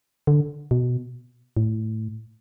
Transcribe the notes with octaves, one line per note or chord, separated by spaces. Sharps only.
D3
B2
A2